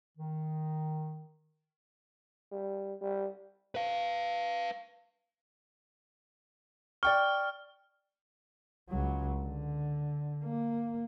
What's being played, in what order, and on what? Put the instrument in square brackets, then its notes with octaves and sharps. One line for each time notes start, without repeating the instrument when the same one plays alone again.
[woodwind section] D#3
[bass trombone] G3
G3
[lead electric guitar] B4 F5
[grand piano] D5 G5 C#6 [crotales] F6
[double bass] C#2 F#3
D3
A#3